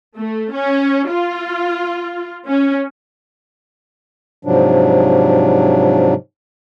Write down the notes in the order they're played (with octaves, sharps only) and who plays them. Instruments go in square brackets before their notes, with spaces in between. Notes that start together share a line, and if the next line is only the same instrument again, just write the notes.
[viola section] A3
C#4
F4
C#4
[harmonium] G#2 C3 F3 F#3 D4